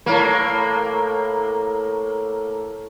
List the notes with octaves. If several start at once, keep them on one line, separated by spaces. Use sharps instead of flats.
A2 A#3